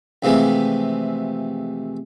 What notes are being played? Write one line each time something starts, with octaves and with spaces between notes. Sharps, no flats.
F2 C3 E3 G#3 A3